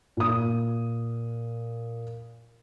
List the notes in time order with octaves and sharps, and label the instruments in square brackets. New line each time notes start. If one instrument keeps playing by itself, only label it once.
[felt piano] A#2 D#6